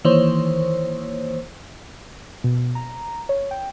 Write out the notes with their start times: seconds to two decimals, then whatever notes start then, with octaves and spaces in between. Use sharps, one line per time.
0.05 D#3 E3 A#3 C5 C#5
2.44 B2
2.75 A#5
3.29 C#5
3.51 G5